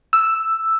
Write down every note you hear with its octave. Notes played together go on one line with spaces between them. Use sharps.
E6